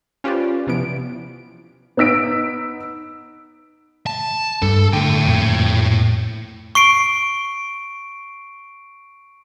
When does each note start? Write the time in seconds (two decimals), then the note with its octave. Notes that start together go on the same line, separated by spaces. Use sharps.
0.24 C#4 F4 G4 B4 C5 D5
0.67 C3 E3 F3 B3 D7
1.97 B3 D#4 E6 B6 D7
4.06 A5
4.62 G2 G3 A4
4.93 A2 D3 G5
5.26 F2 A#2
6.75 C#6 C7 D7